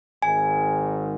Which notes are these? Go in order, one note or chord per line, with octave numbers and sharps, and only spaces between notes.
G#1 G#2 D#3 G#5